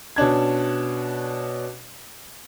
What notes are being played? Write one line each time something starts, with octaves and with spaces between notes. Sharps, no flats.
B2 C#4 D4 G#6